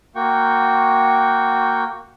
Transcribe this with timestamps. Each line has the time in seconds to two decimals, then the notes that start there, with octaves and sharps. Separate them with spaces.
0.15 A#3 F#4 G5 C#6